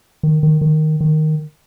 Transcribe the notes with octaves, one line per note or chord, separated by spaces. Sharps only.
D#3
D#3
D#3
D#3